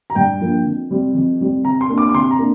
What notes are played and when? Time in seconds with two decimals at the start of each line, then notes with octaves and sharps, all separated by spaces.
0.10 A#5
0.15 G2 G5
0.41 F3 A#3 D4
0.65 F2
0.90 C3 G3 C4
1.15 F2
1.40 C3 G3 C4
1.65 C3 A#5
1.81 C6
1.89 A#3 D4
1.98 D6
2.09 D6
2.14 C3 C6
2.31 A#5
2.39 A#3 D4